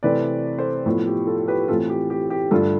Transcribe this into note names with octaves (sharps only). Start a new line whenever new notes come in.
C3 E3 A3 C4 B4 D5
A4 C5
A2 F3 B3
G4
F4 A4
G4 B4
A2 E3 A3 C4 F4 A4
G4
G4
G4
G2 D3 A3 F4 A4